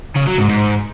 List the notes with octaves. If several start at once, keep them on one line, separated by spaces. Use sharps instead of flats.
C#3
F#3
G#2
G#2